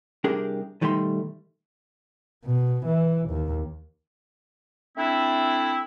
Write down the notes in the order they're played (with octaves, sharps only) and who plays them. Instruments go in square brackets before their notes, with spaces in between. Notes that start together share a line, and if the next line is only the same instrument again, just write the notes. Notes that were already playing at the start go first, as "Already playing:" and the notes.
[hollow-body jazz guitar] C2 D4 G4 G#4 A#4
B2 D#3 G3 A3 F5 C6
[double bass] B2
E3
D#2
[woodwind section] A3 C4 D4 E4